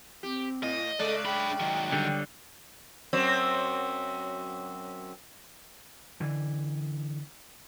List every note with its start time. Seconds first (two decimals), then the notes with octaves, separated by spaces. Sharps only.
0.23 C4 G4
0.63 A2 D#5
0.99 C#3 G#3 A4 D5
1.25 D4 G5 B5
1.60 D#3 F#3
1.92 D3 G3
3.13 F#2 F#3 C4
6.20 D3 E3